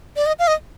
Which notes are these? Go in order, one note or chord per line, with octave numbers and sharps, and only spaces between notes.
D5
D#5
F5
D#5